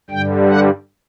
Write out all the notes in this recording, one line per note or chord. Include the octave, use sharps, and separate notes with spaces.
G2 D3 G3 G5
F#5